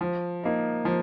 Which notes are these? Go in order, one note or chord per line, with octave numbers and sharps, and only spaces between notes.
F3
A#3 D#4
F3